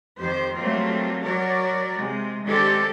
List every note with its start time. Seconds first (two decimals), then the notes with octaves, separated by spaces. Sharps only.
0.18 F2 D#3 G4 C5
0.57 F#3 G3 A3 A#3 C4 F4
1.26 F#3 F#4 A#4 C#5 D5
1.96 C3 G#3
2.43 D#3 G#3 C4 D4 G4 A4